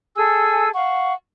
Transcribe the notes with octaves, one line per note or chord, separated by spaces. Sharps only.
G#4 A4 G#5 E6
F5 F#5 C#6